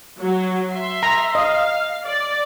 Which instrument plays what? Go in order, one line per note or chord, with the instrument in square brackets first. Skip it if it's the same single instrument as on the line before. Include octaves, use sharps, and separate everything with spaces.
[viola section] F#3
E5 C6
[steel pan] A#5
[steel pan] D#5 [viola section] F5
[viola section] D5